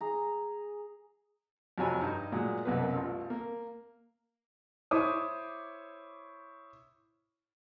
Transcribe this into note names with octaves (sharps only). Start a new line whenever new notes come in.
G#4 A#5
F2 C3 F#3 C#5 G#5 B5
G2 D#4
A#2 F#3 G#3
C2 F#2 B2 A#3 B4
A1 F4
A#3
E4 C5 C#5 D6 D#6